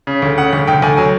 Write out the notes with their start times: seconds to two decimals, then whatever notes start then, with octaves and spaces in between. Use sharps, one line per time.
0.07 C#3
0.22 D2
0.38 C#3 F#5
0.53 D2
0.67 D2 G5
0.82 D2 G#5
0.97 F#3 G#5